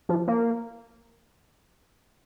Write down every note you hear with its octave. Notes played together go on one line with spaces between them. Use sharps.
F3
A#3